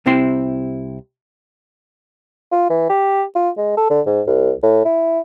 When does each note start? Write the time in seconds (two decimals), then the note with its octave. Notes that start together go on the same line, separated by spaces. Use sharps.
0.06 C2 C3 C4 E4 C6
2.52 F4
2.70 E3
2.90 G4
3.35 F4
3.58 G#3
3.77 A4
3.90 D3
4.06 G#2
4.27 C2
4.63 A2
4.85 E4